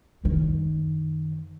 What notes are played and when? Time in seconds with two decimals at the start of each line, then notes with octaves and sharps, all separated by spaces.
0.24 F#2 D#3